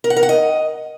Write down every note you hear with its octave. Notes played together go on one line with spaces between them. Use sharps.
A#4
F#5
A#4
F#5
D#5